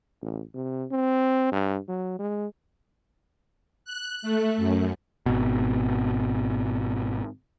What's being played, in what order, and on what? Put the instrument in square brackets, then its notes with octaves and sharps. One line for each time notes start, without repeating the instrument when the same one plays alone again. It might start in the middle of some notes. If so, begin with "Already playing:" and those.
[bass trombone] A1
C3
C4
G2
F#3
G#3
[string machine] F#6
A3
F#2
[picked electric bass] G#1 B2